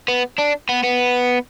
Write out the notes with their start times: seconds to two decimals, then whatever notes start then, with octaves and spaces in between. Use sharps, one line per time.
0.08 B3
0.39 D4
0.69 B3
0.83 B3